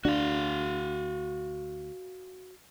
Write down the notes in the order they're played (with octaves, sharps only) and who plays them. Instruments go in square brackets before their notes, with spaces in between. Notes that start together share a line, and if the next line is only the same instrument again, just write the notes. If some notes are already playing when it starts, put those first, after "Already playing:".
[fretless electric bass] D2 D4 [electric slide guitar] F#4 F5